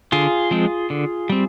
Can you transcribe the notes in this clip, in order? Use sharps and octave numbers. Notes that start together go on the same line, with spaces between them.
D3 F4 G#4
F3 G#3 C4
D3
G3 C4